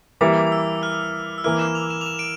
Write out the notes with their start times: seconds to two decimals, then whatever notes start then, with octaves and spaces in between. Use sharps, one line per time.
0.21 E3 G3 A#3 E4 D6
0.47 D6
0.52 E6
0.83 F6
1.38 E6
1.44 E3 A#3 E4 F6
1.59 E7
1.75 F7
1.91 E7
2.01 F7
2.06 E7
2.19 D7